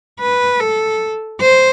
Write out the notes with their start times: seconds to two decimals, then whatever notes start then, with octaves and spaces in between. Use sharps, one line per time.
0.20 B4
0.60 A4
1.41 C5